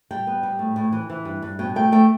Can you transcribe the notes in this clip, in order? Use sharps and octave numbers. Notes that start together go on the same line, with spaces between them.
G3 G5
B3
G3
A2
A2
E3
E3
G2
G2
B2 G5
A3 G5
A3 G5